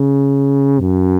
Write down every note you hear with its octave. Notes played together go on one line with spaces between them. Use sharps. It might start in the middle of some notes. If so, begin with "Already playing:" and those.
Already playing: C#3
F#2